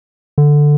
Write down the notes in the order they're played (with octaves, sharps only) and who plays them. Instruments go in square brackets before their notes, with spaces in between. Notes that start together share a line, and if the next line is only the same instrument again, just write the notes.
[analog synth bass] D3